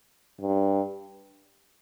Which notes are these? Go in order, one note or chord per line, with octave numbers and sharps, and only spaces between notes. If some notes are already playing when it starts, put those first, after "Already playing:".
G2